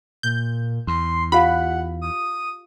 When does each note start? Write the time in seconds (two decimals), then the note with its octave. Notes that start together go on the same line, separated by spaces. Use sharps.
0.23 A#2 G6
0.87 E2 C6
1.32 F4 G4 F5 F#5 B5
2.01 D#6